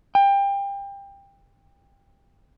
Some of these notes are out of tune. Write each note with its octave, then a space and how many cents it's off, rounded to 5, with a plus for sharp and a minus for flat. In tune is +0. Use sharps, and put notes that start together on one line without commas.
G5 +25